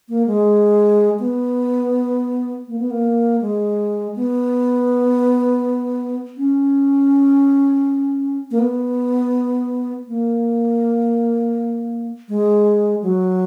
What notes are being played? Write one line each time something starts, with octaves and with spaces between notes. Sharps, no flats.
A#3
G#3
B3
A#3
B3
A#3
G#3
B3
C#4
A#3
B3
A#3
G#3
F#3